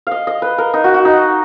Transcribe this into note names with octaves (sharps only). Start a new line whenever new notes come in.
D#5 F5
D#5
B4
A#4
D#4
F#4
F#4
D#4